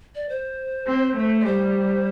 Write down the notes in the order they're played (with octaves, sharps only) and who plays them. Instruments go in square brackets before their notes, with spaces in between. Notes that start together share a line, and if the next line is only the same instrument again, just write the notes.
[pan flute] D5
C5
[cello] C4
A3
[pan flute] D5
[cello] G3 [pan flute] C5